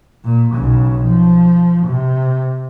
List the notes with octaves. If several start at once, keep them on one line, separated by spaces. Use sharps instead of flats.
A#2
B1 C#3
F3
C3